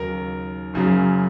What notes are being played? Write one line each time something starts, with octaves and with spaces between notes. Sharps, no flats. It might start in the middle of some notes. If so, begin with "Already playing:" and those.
Already playing: D#2 C#3 F#3 A#4
F#1 F#2 C#3 F#3